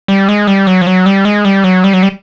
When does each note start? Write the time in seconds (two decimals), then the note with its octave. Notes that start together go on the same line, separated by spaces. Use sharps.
0.08 G3
0.29 G#3
0.47 G3
0.67 F#3
0.81 F3
0.87 F#3
1.06 G3
1.25 G#3
1.45 G3
1.64 F#3
1.84 G3
1.93 F#3
2.03 G3